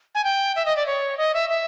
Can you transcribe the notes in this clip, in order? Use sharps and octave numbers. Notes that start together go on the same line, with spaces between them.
G#5
G5
E5
D#5
D5
C#5
D#5
E5
E5